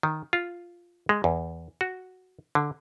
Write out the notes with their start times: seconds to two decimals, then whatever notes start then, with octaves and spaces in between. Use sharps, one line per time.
0.03 D#3
0.33 F4
1.09 G#3
1.24 E2
1.81 F#4
2.55 D3